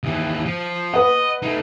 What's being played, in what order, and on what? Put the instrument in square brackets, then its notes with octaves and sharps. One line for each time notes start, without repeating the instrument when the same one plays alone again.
[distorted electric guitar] D#2 E3
F3
[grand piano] B4 F#5 [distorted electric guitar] D#5
[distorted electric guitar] A3 D#4